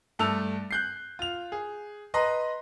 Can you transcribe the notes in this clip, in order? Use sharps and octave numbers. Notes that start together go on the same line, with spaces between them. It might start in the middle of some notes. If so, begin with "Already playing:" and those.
G2 A3 A5 E6 F7
F#6 G6 C7
F4 F7
G#4
B4 D#5 A#5 C6